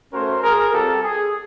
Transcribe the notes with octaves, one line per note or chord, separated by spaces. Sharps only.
A3 C#4 F#4 A#4 C5
G#4 A#4
G3 C4 F4 G4 A4
G#4